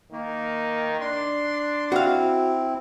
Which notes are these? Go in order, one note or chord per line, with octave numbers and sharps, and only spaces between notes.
D#3 A#3
D4 C6
C4 E4 F#4 F5